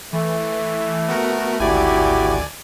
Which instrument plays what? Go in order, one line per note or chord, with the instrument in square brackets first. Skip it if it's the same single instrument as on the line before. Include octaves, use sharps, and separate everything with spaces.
[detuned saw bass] E3 [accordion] A3
[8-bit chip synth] B3 F#4 A#4
[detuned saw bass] G#1 [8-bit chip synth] D2 D5 G#5 [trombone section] E4 F#4 G4